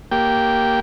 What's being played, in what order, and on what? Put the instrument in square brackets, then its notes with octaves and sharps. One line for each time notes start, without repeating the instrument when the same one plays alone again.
[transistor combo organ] A#3 G4 G5